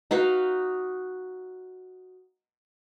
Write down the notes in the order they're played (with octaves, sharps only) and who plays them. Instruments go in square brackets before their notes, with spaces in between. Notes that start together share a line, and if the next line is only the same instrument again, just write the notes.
[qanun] D#4 F#4 B4 F5